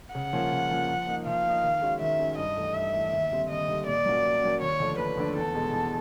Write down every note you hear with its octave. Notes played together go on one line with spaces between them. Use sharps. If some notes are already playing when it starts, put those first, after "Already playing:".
C#3 F#5
F3 A#3 C#4 F4
C#3
F3 A#3 C#4 F4
F3
A#3 D#4
F3 F5
A#3 D#4
D#3
G#3 C#4 F#4
D#3 E5
G#3 C#4 F#4
G2 D#5
E3 A3
G2 E5
E3 A3
D#2
D3 G3 C4
D#2 D#5
D3 G3 C4
A#2 D5
F#3 A#3 C#4 F#4
A#2
F#3 A#3 C#4 F#4
D#2 C#5
D3 F3 A3 D4
D#2 B4
D3 F3 A3 D4
E2 A4
B2 G#3
E2